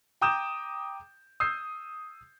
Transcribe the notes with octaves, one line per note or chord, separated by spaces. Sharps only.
G5 A#5 D6 D#6 G6 E7
D#6 E6 G6 C7